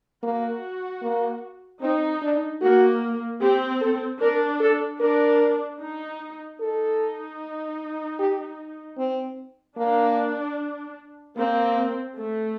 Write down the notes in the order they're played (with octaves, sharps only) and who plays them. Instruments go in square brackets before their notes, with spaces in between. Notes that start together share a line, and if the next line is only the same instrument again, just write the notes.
[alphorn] A#3 [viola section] F#4
[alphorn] A#3
[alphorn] C4 [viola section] D#4
[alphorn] D4
[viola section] A#3 [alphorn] F#4
[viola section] C4 [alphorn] G4
[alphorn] A4
[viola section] D4 [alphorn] A#4
[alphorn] A4
[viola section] D4 [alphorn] A#4
[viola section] D#4
[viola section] D#4 [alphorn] A4
[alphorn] G4
C4
[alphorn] A#3 [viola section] D4
[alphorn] A#3 [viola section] C4
[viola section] A3